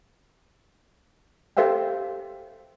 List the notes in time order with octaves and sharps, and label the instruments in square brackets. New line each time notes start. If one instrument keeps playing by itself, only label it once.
[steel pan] G4 A4 C5 E5 F5 G5